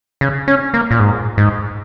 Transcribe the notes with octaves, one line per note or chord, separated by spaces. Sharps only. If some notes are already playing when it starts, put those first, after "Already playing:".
C#3
C#4
A#3
A#2
G#2
G#2